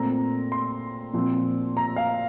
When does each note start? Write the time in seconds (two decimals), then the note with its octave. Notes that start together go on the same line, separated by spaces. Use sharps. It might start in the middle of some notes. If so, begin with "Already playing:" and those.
Already playing: A#2 A3 C4 A#5
0.52 C6
1.14 A#2 F3 C4
1.77 A#5
1.96 F5